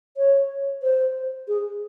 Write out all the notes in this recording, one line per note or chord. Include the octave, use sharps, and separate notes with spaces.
C#5
C5
G#4